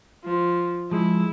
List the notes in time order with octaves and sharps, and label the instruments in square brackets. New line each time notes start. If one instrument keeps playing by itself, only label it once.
[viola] F3
[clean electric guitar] F3 G#3 [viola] E4